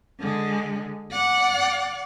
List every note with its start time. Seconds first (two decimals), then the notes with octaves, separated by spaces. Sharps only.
0.20 D3 G#3
1.12 D5 F#5